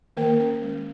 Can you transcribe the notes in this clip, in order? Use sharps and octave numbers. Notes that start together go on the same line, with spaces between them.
D#3 A#3 A#4
C#4
G#3